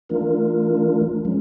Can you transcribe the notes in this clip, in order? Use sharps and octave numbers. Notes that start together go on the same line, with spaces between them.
E3 A3 D4 F4 A#4
F3 G#3 C#4